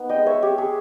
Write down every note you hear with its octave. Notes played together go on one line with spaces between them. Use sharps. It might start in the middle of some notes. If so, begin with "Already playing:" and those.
Already playing: B3 D#4
D#5 G5
G#3
C#5 E5
G#3 G4
G#4